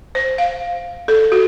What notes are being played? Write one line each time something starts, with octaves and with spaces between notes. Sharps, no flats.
C5
F5
A4
F#4